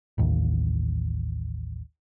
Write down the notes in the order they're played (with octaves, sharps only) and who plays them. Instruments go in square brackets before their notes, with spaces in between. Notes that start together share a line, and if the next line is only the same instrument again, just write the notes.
[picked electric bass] A1 D#2